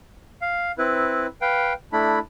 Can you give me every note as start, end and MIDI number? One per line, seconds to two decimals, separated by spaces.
0.42 0.72 77
0.78 1.26 60
0.78 1.26 64
0.78 1.26 71
1.42 1.73 71
1.42 1.73 77
1.42 1.73 79
1.93 2.19 57
1.93 2.19 62
1.93 2.19 64
1.93 2.19 83